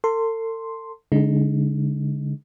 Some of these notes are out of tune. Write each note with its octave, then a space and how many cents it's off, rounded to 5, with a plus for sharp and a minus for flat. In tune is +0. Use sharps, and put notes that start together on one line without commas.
A4 +40 C6 +0
D3 -35 G#3 +0 D#4 +0